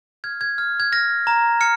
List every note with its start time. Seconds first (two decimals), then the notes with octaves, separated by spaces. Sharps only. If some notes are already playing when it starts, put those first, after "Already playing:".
0.24 F6 G#6
0.41 G#6
0.58 F6
0.80 G#6
0.92 F6 A#6
1.27 A#5
1.61 F6 C#7